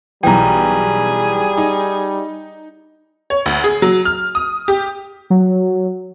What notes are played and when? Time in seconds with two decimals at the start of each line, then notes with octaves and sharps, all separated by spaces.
0.23 B1 E3 G3 G#4 G5 A#5
1.57 D#4
3.30 C#5
3.46 D2
3.64 G#4
3.82 F#3
4.05 F6
4.35 D#6
4.68 G4
5.30 F#3